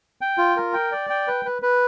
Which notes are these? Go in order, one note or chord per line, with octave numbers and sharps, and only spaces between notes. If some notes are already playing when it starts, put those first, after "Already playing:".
G5
F4
A#4
G5
D5
G5
B4
B4
B4